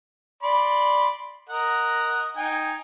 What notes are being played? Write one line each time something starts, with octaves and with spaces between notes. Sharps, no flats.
D5 B5 C6
A#4 D#5 F#5
D#4 G5 G#5